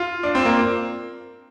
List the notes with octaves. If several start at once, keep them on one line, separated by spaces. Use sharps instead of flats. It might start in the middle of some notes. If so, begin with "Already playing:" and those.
Already playing: F4
D4
C4
A#3